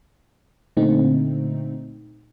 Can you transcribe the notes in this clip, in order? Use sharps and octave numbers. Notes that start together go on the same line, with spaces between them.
A#2 D3 A3 C4 D#4